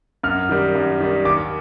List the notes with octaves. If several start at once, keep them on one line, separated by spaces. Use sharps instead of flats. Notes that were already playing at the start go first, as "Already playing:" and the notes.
F#2 F6
D#3 G3
F#2
D#3 G3
D#2 D6